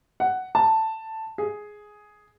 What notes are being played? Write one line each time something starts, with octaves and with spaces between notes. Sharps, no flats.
F#5
A5
G#4